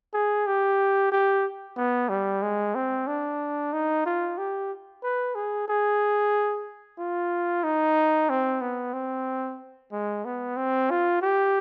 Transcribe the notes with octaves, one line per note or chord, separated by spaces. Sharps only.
G#4
G4
G4
B3
G3
G#3
C4
D4
D#4
F4
G4
B4
G#4
G#4
F4
D#4
C4
B3
C4
G#3
B3
C4
F4
G4